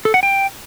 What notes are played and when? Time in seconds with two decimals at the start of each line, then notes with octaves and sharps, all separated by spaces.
0.05 A4
0.14 F#5
0.23 G5